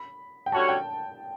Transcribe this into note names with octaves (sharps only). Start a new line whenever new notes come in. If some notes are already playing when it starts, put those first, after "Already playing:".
Already playing: B5
G5
D3 G3 C#4 F#4 C#5 A5
G5